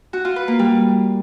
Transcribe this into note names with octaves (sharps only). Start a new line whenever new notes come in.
F#4
F4
B4
A#3
G3